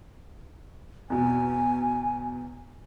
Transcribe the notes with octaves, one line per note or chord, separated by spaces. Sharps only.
E2 B2 G#5